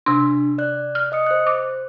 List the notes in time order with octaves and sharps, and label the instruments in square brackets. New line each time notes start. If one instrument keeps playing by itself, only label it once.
[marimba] C3 C6 [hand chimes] D4
[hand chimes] D5 F#6
[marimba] F6
[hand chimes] D#5 D#6 C#7
C5 F#6
[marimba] D6